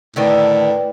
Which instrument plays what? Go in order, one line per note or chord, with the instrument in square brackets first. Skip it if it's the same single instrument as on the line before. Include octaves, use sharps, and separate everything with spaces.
[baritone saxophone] A2 [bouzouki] D3 D#3 D4 [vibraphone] B4 D5 G5